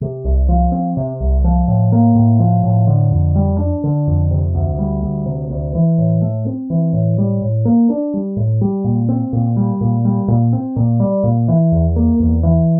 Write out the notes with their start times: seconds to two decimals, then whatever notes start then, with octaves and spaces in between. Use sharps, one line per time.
0.01 C3
0.24 C2
0.49 F3
0.72 C4
0.97 C3
1.20 C2
1.44 F3
1.68 A2
1.92 A#3
2.15 A2
2.40 F3
2.64 A2
2.87 D3
3.11 F2
3.36 G3
3.59 D4
3.84 D3
4.07 F2
4.31 C3
4.55 D2
4.79 G3
5.03 D2
5.26 C3
5.50 D2
5.75 E3
5.98 A2
6.22 A3
6.46 C4
6.70 E3
6.93 A2
7.18 G3
7.42 A2
7.65 A#3
7.90 D4
8.14 G3
8.36 A2
8.61 G3
8.84 A#2
9.09 C4
9.33 A#2
9.57 G3
9.81 A#2
10.05 G3
10.28 A#2
10.53 C4
10.76 A#2
11.00 G3
11.23 A#2
11.48 E3
11.72 E2
11.96 A#3
12.20 E2
12.43 E3